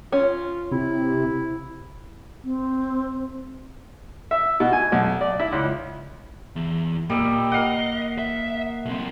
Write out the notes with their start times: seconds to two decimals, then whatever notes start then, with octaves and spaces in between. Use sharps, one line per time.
0.12 C#4 F4
0.71 C3 E4
2.44 C4
4.31 E5
4.60 B2
4.73 G#5
4.92 B1
5.21 D5
5.39 E4
5.52 C#2
6.56 E2
7.10 A#2 G3 A#3 D#5 E6
7.52 A#4 D#5 F5 F#5
8.19 E5
8.85 B1 C4